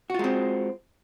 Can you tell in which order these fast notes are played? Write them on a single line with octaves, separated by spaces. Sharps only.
F#4 F4 G#3 C4